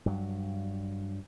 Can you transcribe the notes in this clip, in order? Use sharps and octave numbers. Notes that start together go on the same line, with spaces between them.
G2 F#3